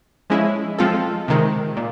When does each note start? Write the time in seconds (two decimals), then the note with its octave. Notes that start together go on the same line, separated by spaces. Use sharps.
0.30 F3 G#3 C#4 E4 G#4
0.78 F3 G#3 C4 F4 A4
1.28 C3 D#3 G#3
1.77 A#2